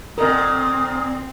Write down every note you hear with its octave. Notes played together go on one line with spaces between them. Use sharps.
A#2 D3 C4 A#4 D#5 D#6